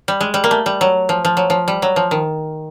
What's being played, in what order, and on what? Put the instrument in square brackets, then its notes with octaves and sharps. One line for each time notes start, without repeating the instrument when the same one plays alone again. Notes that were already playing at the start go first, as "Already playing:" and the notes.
[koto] G3
G#3
G3
A#3
A3
G3
F#3
F3
F3
F#3
F3
G3
F#3
F3
D#3